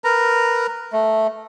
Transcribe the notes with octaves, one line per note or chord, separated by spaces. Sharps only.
A#4 B4 A#5
A3